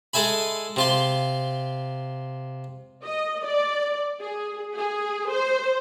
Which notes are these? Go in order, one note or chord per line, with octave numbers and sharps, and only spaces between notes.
G#3 A4 E5 G#5 B5
C3 F4 C6
D#5
D5
G#4
G#4
C5